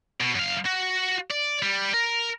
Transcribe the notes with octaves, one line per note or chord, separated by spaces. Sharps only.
B2
F#2 F5
F#4
D5
G3
A#4